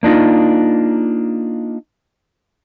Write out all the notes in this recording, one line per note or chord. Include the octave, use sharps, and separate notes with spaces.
A#3 D4 D#4 F4